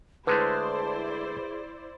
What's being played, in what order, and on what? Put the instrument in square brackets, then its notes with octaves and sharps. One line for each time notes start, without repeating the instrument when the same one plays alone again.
[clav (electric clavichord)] D3 G#3 A3 [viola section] E4 C5 D5 [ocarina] G#4 [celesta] B4